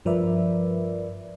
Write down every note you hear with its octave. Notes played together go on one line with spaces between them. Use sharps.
G2 F3 A#4 B4 D5 E5